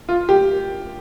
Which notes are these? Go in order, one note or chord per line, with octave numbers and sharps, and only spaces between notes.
F4
G4